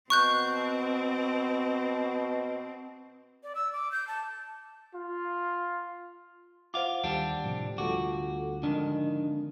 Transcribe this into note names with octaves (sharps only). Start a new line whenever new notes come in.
B2 C4 C#6 F#6 G6
D5
E6
D6
G6
A5
F4
F4 C5 F5 F#5 D6
D#2 D3 G3 D4
A2 C3 F3
D2 G3 F4 F#4 A4 D6
F2 G#2 D3 D#3 D4